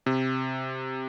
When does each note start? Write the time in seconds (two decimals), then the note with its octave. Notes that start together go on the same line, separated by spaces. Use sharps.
0.06 C3